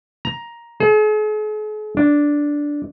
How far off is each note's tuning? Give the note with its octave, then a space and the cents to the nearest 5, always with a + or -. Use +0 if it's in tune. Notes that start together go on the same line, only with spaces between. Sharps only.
A#5 +10
G#4 +45
D4 -5